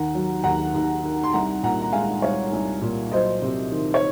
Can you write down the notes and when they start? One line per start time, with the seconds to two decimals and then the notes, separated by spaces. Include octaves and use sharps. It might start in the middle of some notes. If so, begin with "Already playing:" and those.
Already playing: D#2 D#3 F#5 A#5
0.15 F#3
0.44 D#2 F#5 A#5
0.74 D#2
1.04 D#3
1.24 C6
1.33 C2 F#5 A#5
1.63 A#2 F#5 A#5
1.82 A#5
1.92 G#3 F5 G#5
2.22 C2 C#5 F5
2.53 C2
2.82 A#2
3.12 F#3 C5 D#5
3.42 C3
3.72 D#3
3.94 C#5